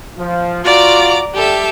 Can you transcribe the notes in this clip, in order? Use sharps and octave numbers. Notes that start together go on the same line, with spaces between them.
F3
F4 F#4 D5 A#5 D6
D3 G3 G4 A4 E5